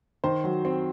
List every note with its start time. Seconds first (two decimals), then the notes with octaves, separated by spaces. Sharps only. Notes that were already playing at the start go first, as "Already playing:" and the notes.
0.24 D#3 C5
0.44 F#3
0.65 C4